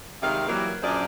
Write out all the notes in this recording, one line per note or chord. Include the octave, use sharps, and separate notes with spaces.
C3 D#3 G3 G#3 F5
E3 F#3 G3 A#3
F#2 A#2 D4 G#4 C5 D5